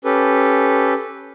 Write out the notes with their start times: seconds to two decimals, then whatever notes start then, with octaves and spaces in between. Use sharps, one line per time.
0.04 C#4 G4 A4 B4